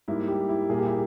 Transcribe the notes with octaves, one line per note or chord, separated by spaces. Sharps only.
G#2 G3 A#3 E4
G4
E4
A#2 G3 A#3 G#4
G4
E4